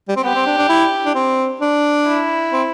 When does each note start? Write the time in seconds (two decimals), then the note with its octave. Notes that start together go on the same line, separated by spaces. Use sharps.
0.09 G3
0.17 C4
0.24 B3 G4
0.35 C4
0.46 D4
0.58 D4
0.69 E4
1.06 D4
1.15 C4
1.61 D4
2.06 E4
2.52 C4